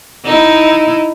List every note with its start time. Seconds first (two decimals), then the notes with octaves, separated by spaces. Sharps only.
0.25 D#4 E4